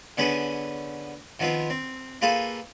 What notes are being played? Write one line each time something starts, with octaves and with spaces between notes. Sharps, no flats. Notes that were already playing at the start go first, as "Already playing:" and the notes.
D3 B3 C#4 G#4 B4
D#3 F3 B3 C4 F4
C4
A#3 F4 G#4 A4 B4